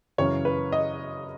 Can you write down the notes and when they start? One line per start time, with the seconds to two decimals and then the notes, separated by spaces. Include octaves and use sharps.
0.18 F#2 C#3 E3 C#5
0.45 B4
0.72 D#5